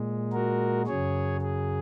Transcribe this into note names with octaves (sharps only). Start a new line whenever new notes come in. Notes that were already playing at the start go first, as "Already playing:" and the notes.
Already playing: A#2 G#3
F#4 A#4
F#2 C#3 F#3 G#4 C#5
G#4